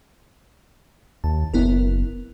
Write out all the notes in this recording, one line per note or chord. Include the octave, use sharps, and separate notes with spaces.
D#2 A5
F#1 B3 E4 A#4